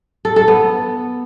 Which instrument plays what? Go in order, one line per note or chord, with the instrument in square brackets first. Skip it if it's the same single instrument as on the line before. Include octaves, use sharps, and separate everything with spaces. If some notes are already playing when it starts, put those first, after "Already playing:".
[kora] A4
A4
B3